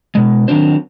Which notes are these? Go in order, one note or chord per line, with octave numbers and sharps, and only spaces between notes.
B2 G#3
D#3 F#3 C4 D4 C5